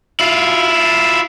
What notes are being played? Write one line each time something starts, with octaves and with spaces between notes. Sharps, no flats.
E4 F4